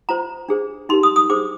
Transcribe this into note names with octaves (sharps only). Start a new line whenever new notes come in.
F4 C5 A#5
D4 G#4 C5
D#4 G4 A#4 C6
D#6
D#6
D4 G#4 C5 D6